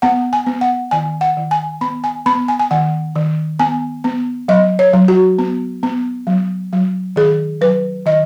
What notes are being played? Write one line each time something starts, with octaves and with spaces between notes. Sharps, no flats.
B3 F#5
G#5
B3
F#5
D#3 G#5
F#5
D#3
G#5
B3 B5
G#5
B3 B5
G#5
G#5
D#3 F#5
D#3
B3 G#5
B3
F#3 D#5
C#5
F#3
F#4
B3
B3
F#3
F#3
D#3 G#4
F#3 B4
D#3 D#5